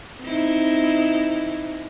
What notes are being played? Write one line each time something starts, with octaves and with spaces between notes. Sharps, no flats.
C4 D#4 E4